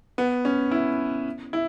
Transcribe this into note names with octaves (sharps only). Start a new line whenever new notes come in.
B3
C#4
E4
E4